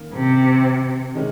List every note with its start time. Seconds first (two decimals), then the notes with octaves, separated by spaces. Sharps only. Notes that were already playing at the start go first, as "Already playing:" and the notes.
Already playing: D#3 A#3 C#4
0.14 C3
1.14 C3 D#3 G#3 C#4